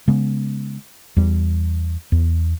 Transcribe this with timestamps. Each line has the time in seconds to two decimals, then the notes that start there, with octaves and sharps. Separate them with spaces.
0.08 C#3 G#3 B3
1.17 E2 G3
2.12 E2